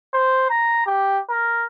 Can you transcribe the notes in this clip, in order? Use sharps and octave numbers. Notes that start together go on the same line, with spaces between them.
C5
A#5
G4
A#4